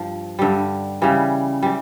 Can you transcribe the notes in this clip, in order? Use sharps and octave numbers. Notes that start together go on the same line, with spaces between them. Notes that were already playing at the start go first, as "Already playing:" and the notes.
Already playing: G2 F3
G2 D3 G3
C#3 E3 G3
G3
E3